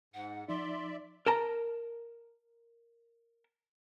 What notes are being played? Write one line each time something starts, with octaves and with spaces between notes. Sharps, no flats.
G#2 F#5
F3 D#4 D5 E5 C6
A#4 A5 A#5